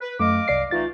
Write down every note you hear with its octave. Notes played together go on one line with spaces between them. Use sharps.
B4
F#2 A3 D#5 F5 D6
C2 D5 C7
E3 A3 D#4 F4 A6